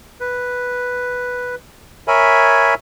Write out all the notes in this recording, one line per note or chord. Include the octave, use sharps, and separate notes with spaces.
B4
A#4 C#5 E5 G#5 B5